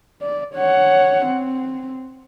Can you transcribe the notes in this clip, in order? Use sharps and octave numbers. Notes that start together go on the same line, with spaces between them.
D5
C#5 F#5
C4